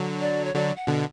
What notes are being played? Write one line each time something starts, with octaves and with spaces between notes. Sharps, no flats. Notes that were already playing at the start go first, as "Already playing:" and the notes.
Already playing: D3 F#3
D5
C#5
D3 F#3 D5
F#5
B2 D3